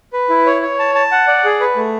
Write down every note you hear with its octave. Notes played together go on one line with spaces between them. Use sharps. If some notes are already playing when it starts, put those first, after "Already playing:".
B4
E4
C#5
C#5
A5
A5
F#5
D5
G#4
B4
A3